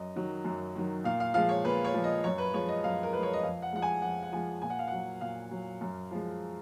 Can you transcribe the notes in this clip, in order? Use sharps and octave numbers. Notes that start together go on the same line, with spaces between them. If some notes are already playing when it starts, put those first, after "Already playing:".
Already playing: F#2 D#5
D#3 F#3
F#2
D#3 F#3
A#2 F5
F5
F3 G#3 F5
C#5
A#2 B4
C#5
F3 G#3
D#5
F#2 C#5
B4
F3 G#3 C#5
D#5
F#2 F5
A#4
F3 G#3 B4
C#5
D#5
F2 F5
F#5
F3 G#3 F#5
G#5
F2 F#5
F#5
F3 G#3 G#5
A#2 G#5
F#5
F5
F#3 F#5
A#2 F5
F#3
F#2
F3 G#3